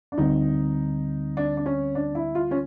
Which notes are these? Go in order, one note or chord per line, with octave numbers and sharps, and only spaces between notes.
D4
D2 D3 G3 C4 D#4
D4
D4
C#4
D4
E4
F4
C#4